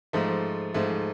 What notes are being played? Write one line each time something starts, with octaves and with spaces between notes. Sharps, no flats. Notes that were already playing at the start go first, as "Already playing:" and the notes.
G#2 F3 A3
G#2 F3 A3